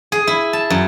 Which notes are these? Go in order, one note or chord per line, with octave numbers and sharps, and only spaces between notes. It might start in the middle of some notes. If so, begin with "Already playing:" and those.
G#4
E4
A5
F#2